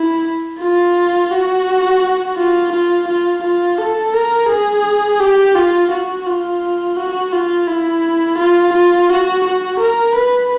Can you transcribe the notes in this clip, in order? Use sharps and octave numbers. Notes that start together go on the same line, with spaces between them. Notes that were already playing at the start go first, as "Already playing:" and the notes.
Already playing: E4
F4
F#4
F4
F4
F4
F4
A4
A#4
G#4
G4
F4
F#4
F4
F#4
F4
E4
F4
F4
F#4
F#4
A#4
B4